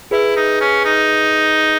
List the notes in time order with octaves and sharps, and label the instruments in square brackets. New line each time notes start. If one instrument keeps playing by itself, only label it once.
[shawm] E4 [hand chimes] G#4 B4 E5
[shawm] D#4
C#4
D#4